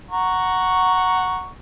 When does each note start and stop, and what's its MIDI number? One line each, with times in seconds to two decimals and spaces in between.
0.11 1.50 78
0.11 1.50 82
0.11 1.50 85